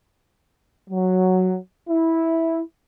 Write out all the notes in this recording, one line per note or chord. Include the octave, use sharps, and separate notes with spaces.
F#3
E4